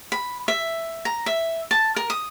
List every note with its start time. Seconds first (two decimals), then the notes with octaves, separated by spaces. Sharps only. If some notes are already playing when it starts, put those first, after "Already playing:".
0.12 B5
0.48 E5
1.05 A#5
1.26 E5
1.71 A5
1.96 A#4
2.10 D#6